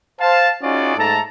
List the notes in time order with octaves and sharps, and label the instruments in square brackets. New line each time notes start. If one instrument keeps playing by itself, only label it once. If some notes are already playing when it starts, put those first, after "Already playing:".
[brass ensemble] C5 F5 A5
C#4 D#4 F4 F#4 G#4 D5
G#2 A3 A4 A5 A#5